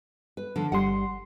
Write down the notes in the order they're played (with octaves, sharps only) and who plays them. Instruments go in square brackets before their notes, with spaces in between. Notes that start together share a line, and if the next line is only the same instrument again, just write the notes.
[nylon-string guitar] B4
D3 F3
[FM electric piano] G1 G3 C6 [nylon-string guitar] F#5